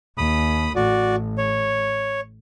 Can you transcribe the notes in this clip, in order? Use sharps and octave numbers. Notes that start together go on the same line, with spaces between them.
D#2 B5 D#6
A1 F#4 D5
C#5